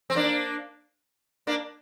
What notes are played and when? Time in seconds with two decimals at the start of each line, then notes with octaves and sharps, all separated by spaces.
0.10 C4
0.15 A#3 D4
1.47 A#3 D4